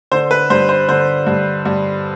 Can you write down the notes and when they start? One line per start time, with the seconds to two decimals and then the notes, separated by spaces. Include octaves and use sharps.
0.11 D3 C5
0.31 B4
0.50 G2 C5
0.69 C5
0.89 D3 C5
1.27 G2
1.65 G2